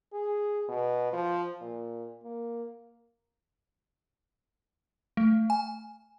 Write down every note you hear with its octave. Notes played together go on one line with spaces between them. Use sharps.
G#4
B2
F3
A#2
A#3
A3
G#5